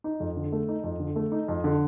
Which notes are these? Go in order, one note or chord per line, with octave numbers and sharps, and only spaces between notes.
D#4
F2
D3
A3
D#4
F2
D3
A3
D#4
F2
D3